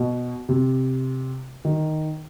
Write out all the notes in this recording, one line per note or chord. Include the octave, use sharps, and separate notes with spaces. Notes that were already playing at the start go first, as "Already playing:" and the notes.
Already playing: B2
C3
D#3